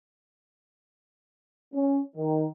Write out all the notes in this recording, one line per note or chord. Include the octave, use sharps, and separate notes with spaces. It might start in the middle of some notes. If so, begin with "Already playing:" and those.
C#4
D#3